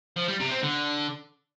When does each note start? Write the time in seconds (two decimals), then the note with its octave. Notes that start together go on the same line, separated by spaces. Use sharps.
0.17 F3
0.28 G3
0.40 C3
0.51 C4
0.63 D3